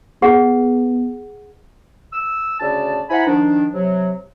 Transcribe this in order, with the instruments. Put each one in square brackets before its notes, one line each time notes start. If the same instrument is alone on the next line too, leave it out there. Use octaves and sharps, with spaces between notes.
[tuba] B3 [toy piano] G#4 F#5
[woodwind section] E6
D2 C#3 D5 A5
E4 C5 F#5 G#5 A#5 B5
D#3 F3 D4
C3 F#3